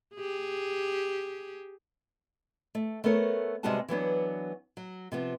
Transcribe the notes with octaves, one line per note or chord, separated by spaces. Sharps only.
G4 G#4
A3
A3 B3 A4 A#4 C#5
C3 G3 G#3 B3 F#4 A5
E3 F#3 B3 D4
F#3
C3 F3 B3